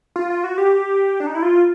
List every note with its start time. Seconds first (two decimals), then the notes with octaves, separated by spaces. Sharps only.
0.16 F4
0.30 F4
0.44 F#4
0.58 G4
1.20 D4
1.27 D#4
1.35 E4
1.42 F4